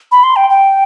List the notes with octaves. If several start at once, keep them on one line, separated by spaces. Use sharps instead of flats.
B5
C6
G5
G5